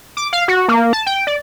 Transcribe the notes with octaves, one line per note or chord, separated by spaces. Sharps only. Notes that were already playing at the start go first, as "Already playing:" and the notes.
D6
F5
F#4
A#3
A5
G5
D5